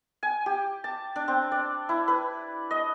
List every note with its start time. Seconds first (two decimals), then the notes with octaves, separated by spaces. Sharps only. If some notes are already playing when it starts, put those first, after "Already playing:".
0.23 G#5
0.46 G4
0.84 A5
1.16 D4
1.28 C4
1.51 D5
1.89 E4
2.08 B4
2.71 D#5